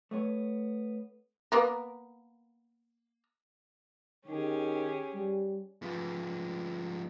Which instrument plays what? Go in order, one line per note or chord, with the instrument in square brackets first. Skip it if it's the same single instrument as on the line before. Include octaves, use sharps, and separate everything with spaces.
[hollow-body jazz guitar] A3 B3 C#5
[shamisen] A#3 B3 A#4
[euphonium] D#3 [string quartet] C#4 G4 G#4
[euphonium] G3
[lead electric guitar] F3 B3